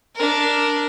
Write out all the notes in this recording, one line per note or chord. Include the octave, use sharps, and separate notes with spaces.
D4 A#4